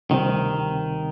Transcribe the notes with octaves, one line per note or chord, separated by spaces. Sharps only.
D2 C3 D#3 G3 C4